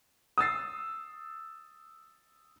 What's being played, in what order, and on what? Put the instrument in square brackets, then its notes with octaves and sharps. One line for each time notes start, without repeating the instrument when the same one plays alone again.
[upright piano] D#6 E6 A6 C7